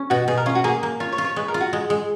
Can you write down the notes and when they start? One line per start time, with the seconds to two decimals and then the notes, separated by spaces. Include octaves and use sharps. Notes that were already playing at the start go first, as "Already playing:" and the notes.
Already playing: C#4
0.10 B2 F#4
0.28 B2 G#4
0.37 A#4
0.46 C#4 F4
0.55 F#4
0.64 A#3 G#4
0.83 A#3
1.00 F4 C#5
1.12 C#5
1.18 F4
1.24 C#5
1.36 G#3 B4
1.48 A#4
1.54 F4
1.61 F#4
1.73 G#3
1.90 G#3